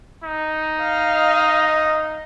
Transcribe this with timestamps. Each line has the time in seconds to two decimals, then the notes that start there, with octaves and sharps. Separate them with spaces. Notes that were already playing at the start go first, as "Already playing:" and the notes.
0.24 D#4
0.82 F5
1.14 D#5